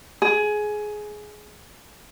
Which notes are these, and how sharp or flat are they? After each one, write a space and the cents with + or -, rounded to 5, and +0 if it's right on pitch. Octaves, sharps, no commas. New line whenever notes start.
G#4 +15